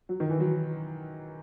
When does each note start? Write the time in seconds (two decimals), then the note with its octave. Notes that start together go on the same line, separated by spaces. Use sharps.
0.09 F#3
0.20 D#3
0.30 E3
0.40 F#3